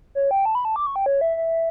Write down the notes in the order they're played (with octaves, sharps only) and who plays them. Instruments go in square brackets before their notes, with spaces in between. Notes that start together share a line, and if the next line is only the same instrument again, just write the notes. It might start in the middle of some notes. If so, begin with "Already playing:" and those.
[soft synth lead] C#5
G5
A5
B5
A5
D6
C#6
G5
C#5
E5
E5